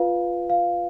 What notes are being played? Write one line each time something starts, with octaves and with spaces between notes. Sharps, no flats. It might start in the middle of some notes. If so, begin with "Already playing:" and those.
Already playing: F4 B4 F5
F5